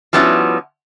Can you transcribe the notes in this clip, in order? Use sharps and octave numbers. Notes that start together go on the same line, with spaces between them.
F3 G3 B3 C#4 E4 F#4